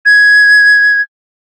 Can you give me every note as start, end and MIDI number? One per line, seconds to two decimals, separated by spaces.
0.06 1.01 92